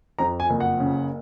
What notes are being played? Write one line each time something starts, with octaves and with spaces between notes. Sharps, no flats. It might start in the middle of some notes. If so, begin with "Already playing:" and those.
F2 A#5
G#5
F#1
F#5
C#3